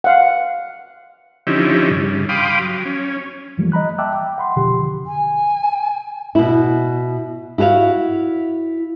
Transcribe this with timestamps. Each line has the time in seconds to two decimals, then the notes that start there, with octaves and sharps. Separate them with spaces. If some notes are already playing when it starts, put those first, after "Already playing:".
0.04 F5 F#5
1.47 D3 F3 C#4 D#4 E4 G4
1.90 G2 C#3
2.29 F5 G5 B5 C6 D6 D#6
2.59 F#3
2.85 C#4
3.57 F#2 E3 F3 G3 A3 A#3
3.72 D#5 A#5 B5 F#6
3.98 E5 G5 A5 D6 E6 F#6
4.13 G5
4.38 F#5 B5 C6
4.56 F2 B2 D3 F3 G4 C6
5.06 G#5
6.35 B2 E4
7.58 E4 F#4 G#4 C#5 F5